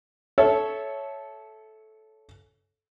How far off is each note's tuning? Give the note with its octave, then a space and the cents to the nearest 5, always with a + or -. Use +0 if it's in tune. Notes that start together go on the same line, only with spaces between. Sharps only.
A4 -15 C#5 +0 E5 +0